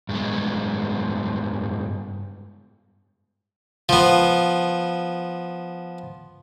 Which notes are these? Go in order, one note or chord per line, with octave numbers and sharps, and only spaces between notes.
G2 G#3 B3
F3 B3